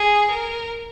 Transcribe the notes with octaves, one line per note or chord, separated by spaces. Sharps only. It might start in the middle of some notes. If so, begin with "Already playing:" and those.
Already playing: G#4
A#4